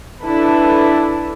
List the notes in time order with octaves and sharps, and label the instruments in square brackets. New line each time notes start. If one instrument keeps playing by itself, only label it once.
[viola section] D4 E4 A4 B4